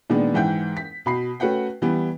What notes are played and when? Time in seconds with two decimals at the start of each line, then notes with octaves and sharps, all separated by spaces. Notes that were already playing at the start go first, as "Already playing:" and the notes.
0.10 A#2 D#3 G#3 B3 D4
0.34 G#2 E3 F#5 G5 G6
0.77 B6
1.06 B2 B5 C7
1.40 A3 C#4 F#4 B4 F#5 G5
1.82 E3 G3 B3